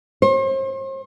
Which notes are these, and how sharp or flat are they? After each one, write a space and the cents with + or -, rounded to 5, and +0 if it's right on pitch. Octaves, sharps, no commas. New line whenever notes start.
C5 +40